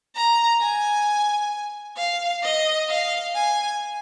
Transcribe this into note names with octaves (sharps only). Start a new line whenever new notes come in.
A#5
G#5
F5
D#5
F5
G#5